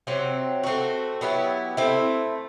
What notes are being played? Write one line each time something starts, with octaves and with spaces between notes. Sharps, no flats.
C3 F#3 C4
A3 C4 F#4
F#3 B3 E4 G4
A3 C4 E4